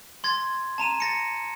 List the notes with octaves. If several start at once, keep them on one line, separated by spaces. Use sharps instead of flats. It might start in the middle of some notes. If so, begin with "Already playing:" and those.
C6 G#6 A6
A5 A#5 D#7 E7
A6 A#6 C#7